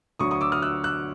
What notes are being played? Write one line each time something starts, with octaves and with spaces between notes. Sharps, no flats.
D2 D3 F#3 C#6 D#6
C#6 D#6
D6 E6
D#6 F6
E6 F#6
E6 F#6